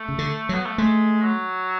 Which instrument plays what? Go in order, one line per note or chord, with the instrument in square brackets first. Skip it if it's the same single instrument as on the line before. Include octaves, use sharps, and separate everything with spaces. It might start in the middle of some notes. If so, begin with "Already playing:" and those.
Already playing: [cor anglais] A3
[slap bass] C#3
D3
F#3
[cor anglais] B3
A3
[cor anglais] G#3 [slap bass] A3
[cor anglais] F#3